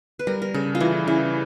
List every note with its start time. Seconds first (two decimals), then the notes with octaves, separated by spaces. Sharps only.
0.19 B4
0.27 G3 A#4
0.42 A#4
0.54 C#3 A4
0.75 F4
0.80 E3 E4
1.07 C#3 E4